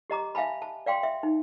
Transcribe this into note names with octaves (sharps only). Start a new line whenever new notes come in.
G4 D#5 A#5 D6
E5 F5 G#5 A5 B5
A5
D5 F5 G5 C6
E5
D#4